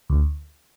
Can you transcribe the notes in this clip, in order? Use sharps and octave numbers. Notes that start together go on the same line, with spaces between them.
D2